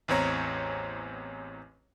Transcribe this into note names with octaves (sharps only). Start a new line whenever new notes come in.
A1 E2 C4 C#5 A#5